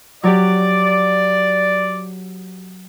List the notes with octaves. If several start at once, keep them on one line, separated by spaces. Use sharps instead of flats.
F#3 G4 D5